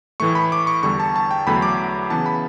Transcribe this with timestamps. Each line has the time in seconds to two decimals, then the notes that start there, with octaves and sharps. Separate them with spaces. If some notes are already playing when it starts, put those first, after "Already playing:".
0.20 A2 E3 A3 C#6
0.35 B5
0.52 D6
0.67 C#6
0.83 E2 D3 G3 C#6
1.00 A5
1.16 A5
1.31 G5
1.47 E2 D3 F#3 A3 B5
1.62 D6
2.10 C#3 E3 B3 A5
2.26 B5